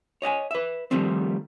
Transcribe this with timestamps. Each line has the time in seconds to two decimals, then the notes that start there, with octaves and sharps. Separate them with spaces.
0.22 C#5 D#5 F#5 G#5
0.51 B4 E5
0.91 D#3 F3 G3 A3 C4